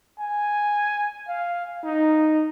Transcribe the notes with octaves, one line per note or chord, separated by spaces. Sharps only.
G#5
F5
D#4